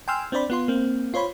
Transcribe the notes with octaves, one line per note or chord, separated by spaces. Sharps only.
G5 G#5 C6 E6 F6
C4 D4 C5 D5 B5
B3 F4 C6
A#3 C4
F4 C5 C#5 B5